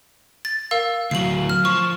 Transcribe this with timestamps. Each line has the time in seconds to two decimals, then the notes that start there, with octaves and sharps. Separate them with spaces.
0.45 A6
0.71 A#4 F5 E6
1.11 D2 F#3 C7 F#7
1.49 F6
1.65 F3 C#6